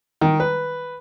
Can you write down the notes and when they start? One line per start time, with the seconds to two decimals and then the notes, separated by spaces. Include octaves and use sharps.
0.21 D#3
0.40 B4